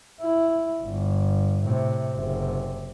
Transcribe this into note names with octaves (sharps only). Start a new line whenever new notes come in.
E4
G1
A2 C3
F#1 C3